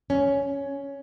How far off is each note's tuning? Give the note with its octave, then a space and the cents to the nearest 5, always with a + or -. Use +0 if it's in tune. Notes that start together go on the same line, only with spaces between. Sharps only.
C#4 +10